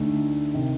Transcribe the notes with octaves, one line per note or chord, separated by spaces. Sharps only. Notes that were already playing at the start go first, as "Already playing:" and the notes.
Already playing: D2 D3 A3 D#4
C3 D#3